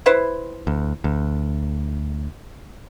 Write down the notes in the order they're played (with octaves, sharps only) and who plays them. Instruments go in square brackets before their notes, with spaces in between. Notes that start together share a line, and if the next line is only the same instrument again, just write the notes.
[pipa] E4 B4 C5
[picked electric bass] D2
D2